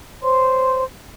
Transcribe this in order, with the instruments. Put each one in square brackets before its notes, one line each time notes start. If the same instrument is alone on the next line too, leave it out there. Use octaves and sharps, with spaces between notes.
[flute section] C5 C#5 C6